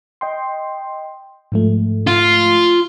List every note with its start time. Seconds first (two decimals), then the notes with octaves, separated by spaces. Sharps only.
0.21 D#5 G5 C6
1.52 G#2 F3 A3
2.07 F4